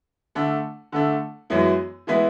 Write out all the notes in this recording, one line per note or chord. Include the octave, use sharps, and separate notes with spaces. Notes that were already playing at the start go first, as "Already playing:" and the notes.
D3 A3 D4
D3 A3 D4
F#2 E3 G#3 B3 E4
E3 G#3 B3 E4